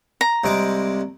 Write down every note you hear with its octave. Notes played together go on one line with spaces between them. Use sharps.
A#5
C2 G#3 D6